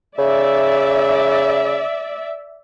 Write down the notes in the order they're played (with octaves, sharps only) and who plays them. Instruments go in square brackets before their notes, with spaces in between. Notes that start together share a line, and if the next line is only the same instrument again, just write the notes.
[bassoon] C#3 [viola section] D5 E5